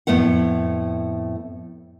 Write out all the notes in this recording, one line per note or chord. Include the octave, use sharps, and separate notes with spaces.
F2 A2 A3 B3 F#5